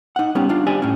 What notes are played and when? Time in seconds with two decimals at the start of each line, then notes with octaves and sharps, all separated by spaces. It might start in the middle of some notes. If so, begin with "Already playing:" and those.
0.16 D#4 F#5
0.35 G3 B3 C#4 G4
0.49 D4 F4
0.67 G4 C5 D5 G#5
0.82 A2 C#4